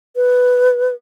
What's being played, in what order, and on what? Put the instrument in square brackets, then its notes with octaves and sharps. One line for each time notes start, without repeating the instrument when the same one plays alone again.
[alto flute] B4